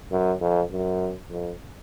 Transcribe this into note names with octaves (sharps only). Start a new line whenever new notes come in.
F#2
F2
F#2
F2